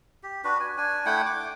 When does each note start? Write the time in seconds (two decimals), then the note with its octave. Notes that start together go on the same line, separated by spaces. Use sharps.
0.23 G4
0.44 D4 F#4 B4
0.60 G#5
0.77 D4 G#5
1.06 A3 E4 F#5 G5
1.26 D6